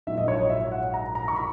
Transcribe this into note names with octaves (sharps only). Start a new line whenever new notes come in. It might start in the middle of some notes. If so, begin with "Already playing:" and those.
A#1 G#2 F#3 E5
D#5
C#5
D#5
E5
F#5
A#5
A#5
C#6
B5